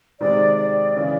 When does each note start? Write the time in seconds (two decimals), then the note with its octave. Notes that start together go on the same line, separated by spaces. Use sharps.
0.20 C3 D#3 G#3 D5
0.57 D5
0.95 C#3 E3 D5